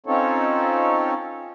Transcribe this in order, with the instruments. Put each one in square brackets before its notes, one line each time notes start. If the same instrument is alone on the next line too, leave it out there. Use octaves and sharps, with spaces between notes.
[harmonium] C4 C#4 D#4 F4 A4 C#5